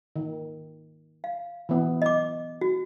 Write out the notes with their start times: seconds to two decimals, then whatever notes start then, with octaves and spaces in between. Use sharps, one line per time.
0.16 D#3
1.24 F5
1.69 E3 B3
2.02 D#5 D6
2.61 F#4